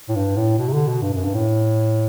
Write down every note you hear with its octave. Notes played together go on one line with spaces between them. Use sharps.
A2
G2
A2
B2
C3
D3
B2
G2
F#2
G2
A2